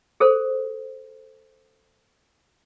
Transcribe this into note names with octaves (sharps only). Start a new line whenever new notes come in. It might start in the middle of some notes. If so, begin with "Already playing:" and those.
G#4 A4 C5